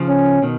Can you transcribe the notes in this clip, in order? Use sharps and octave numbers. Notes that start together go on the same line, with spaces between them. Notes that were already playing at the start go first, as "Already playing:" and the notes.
Already playing: C#3 F3
C#4
B2 D#3